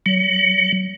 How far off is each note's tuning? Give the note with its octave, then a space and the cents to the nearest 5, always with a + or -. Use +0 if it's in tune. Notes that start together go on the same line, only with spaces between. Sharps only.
F#3 +30